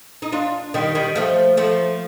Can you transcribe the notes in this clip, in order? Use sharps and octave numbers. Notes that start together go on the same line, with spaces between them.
D#4
D4 F4
D#3 G3
D#3 G3
F3 A3
F3 A3